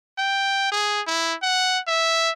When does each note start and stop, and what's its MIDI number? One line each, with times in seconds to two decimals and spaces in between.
0.18 0.69 79
0.72 1.01 68
1.07 1.35 64
1.43 1.79 78
1.88 2.31 76